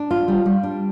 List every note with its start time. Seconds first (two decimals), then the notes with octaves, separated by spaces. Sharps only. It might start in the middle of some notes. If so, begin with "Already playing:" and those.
Already playing: D4
0.11 F4
0.28 G3
0.46 G3
0.63 D4